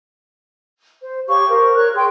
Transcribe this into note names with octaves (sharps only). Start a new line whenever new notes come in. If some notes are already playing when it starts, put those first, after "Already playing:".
C5
G4 C#5 F5 C#6
A#4 C5
A#4 C#5 C#6 F#6
G#4 G5 C6